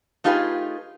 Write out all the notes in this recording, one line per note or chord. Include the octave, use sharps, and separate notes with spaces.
A3 D#4 F4 G4 G#4 B4